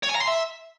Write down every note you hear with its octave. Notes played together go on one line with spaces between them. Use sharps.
C#5
G#5
A#5
C6
E5